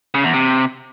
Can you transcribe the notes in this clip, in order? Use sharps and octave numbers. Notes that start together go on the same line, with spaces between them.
C#3
E2
C3